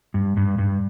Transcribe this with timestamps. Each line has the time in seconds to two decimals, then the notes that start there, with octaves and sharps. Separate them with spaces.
0.14 G2
0.37 G2
0.58 G2